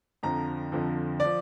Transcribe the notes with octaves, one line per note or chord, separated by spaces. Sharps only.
F2 D3 F3 A#5
F2 D3 F3
F3 D5